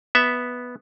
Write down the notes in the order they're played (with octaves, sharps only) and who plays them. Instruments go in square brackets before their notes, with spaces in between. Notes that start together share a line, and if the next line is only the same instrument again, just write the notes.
[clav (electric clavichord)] B3 E5